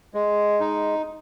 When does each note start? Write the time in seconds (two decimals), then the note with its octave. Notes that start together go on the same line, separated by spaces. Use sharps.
0.14 G#3
0.60 D#4